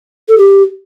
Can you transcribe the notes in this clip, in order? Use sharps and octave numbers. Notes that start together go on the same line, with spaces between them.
A4
G4